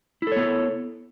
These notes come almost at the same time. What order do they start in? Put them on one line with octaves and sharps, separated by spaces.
E4 A4 C#5 B3